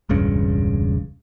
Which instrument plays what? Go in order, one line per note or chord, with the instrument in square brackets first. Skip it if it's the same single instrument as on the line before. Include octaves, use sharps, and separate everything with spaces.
[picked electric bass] E1 C#2 G2 C#3